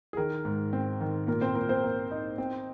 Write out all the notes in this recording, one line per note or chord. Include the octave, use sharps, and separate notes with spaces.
G#4
D#3 A#4
G#2
C4
D#3
A#2 A#4
C4 C5
A#2 A#4
C4 C5
A#3
D#4
C4